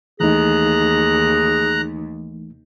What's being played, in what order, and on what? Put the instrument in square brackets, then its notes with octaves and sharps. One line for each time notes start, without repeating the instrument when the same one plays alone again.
[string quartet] D#2 [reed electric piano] E3 A3 D#4 [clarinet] G#4 [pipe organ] A#5 F#6